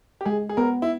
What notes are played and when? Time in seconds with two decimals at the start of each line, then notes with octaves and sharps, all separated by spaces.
0.21 G4
0.26 G#3 G#4
0.49 G#4
0.57 B3 A#4
0.82 E4